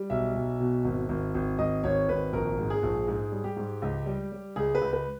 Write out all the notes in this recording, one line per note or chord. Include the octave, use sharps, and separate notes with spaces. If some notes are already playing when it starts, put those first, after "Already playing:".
Already playing: G3
B1 E5
B1
B2
G#1
G#1
G#1
G#1 D#5
G#1 C#5
G#1 B4
A#1 A#4
G#2
G#4
A#1
G#2 G#4
G3
G4
G#2
C#2
G3
G3
C#2 G#4
B4
C#2
B4